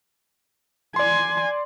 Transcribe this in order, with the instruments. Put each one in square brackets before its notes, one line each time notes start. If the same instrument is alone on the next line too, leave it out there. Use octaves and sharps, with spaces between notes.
[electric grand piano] D5 C6 [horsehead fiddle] G#5